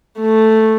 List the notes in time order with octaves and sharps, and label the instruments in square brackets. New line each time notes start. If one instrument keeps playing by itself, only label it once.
[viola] A3